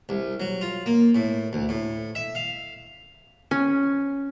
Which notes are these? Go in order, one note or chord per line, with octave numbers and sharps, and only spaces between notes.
C2
F#3
F4
A#3
A2
D2
A2
E5
F5
C#4